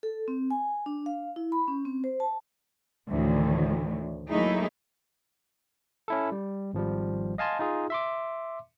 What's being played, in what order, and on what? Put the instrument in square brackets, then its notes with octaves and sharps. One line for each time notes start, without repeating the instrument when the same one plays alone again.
[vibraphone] A4
C4
G#5
D4
F5
E4
B5
C#4
C4
C5
A5
[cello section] D2 A2 D#3 E3
F#3 A3 A#3 D#4 E4 G#4
[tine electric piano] C#4 E4 A4
G3
G#1 F3 G3
D#5 F5 G#5 A5 C6
D#4 F4 G#4
E5 C6 D6